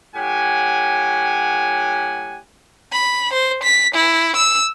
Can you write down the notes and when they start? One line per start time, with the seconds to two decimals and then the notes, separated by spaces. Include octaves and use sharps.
0.15 A2 F#3 G4 F#5 G#5
2.92 B5
3.33 C5
3.63 B6
3.95 E4
4.36 E6